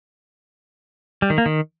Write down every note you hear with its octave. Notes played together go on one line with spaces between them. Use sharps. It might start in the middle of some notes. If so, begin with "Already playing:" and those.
G3
D#3
A#3
D#3